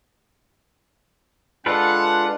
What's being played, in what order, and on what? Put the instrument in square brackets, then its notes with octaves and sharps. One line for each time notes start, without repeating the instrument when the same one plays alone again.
[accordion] G#3 D4 [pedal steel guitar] F4 A4 B4 [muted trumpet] F#5